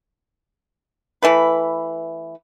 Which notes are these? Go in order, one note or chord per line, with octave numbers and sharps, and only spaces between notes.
E3 A3 B4